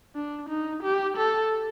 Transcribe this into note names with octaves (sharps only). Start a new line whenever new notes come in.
D4
D#4
G4
A4